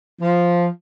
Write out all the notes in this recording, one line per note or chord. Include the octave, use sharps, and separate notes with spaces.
F3